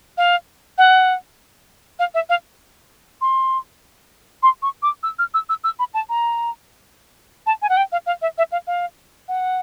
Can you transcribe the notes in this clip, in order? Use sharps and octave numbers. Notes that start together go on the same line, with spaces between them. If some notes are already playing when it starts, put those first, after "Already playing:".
F5
F#5
F5
E5
F5
C6
C6
C#6
D6
E6
F6
E6
E6
E6
B5
A5
A#5
A5
G#5
F#5
G5
F5
F5
E5
E5
F5
F5
F#5